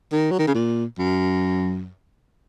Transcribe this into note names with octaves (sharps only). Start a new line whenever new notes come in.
D#3
F#3
D#3
C#3
A#2
F#2